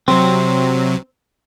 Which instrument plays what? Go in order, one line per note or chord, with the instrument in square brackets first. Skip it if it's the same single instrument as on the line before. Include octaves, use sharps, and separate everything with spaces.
[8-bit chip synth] C3 F#3 [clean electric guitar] C4